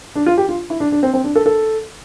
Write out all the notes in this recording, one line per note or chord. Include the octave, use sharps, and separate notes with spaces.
D4
F4
G4
F4
E4
D4
D4
C4
C4
D4
A4
A4